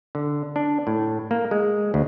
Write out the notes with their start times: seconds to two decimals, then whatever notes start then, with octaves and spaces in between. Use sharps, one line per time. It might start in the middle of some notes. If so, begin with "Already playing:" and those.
0.15 D3
0.56 D4
0.87 A2
1.31 A#3
1.51 G#3
1.94 D2